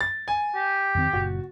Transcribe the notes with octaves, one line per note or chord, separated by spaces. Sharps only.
A6
G#5
G4
F2 D#3 C4
F#1 A#2 F#4